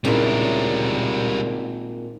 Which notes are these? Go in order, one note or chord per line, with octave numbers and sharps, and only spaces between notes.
G#1 A#2 C#3 G3 C#4 E4 A#4